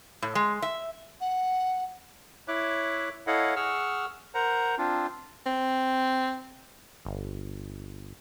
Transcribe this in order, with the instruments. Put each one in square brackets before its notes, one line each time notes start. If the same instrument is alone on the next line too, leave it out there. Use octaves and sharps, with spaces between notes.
[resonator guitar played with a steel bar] A2
G#3
E5
[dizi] F#5
[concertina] E4 C#5 E5 D6 F#6
E4 A4 C#5 D#5 F5 F#5
G#4 F#5 C#6 E6 F6
A#4 C5 F#5 A#5
C4 D4 F4
[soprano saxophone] C4
[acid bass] G1